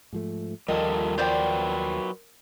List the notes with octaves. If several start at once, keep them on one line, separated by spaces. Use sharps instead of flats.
G#2 F3 A3
D#2 F3 G3 F4 A4 A#4 D#5
F#3 F4 B4 C5 D5 G5